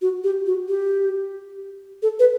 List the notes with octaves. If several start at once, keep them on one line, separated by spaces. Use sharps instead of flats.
F#4
G4
F#4
G4
A4
B4